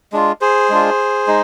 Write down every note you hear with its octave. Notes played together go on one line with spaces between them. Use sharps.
G#3 D4 F4
G#4 C5
G#3 D4 F4
G#3 D#4